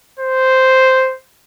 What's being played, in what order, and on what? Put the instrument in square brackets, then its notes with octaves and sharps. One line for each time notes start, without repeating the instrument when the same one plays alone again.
[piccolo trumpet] C5